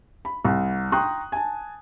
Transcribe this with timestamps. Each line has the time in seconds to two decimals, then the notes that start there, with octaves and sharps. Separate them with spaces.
0.25 B5
0.45 C2
0.92 G5 A#5 C6 C#6 D#6 F#6
1.32 G#5 A5